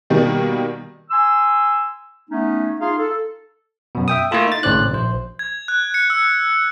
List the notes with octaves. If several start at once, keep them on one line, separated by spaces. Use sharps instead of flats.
B2 D#3 G3 A#3
G#5 C6 E6
A3 B3 C#4 D#4
D#4 F4 G#4 F5 C6
A4
F#2 B2
E5 G5 D#6
A3 A#3 E4 F4 A4
D#4 A6
G#1 A2 C#3 C5 D5 F#6
A#1 C5
G#6
F#6
C#7
E6